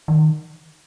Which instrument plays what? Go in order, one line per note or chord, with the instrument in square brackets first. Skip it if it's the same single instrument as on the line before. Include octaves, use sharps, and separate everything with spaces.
[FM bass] D#3